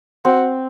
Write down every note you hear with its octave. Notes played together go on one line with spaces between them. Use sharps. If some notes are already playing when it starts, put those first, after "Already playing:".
C4 F#4